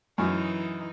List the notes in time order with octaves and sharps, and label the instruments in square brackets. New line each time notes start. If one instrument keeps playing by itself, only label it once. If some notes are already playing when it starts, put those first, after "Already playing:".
[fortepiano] F#2 [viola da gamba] E3 D#4